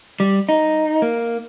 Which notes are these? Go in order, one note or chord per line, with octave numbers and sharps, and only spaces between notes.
G3
D#4
A#3